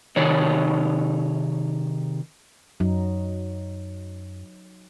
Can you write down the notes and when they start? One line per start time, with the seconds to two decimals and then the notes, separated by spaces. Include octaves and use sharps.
0.16 C3 D#3 D#4 C#5 D5
2.80 F#2 F#3 D#4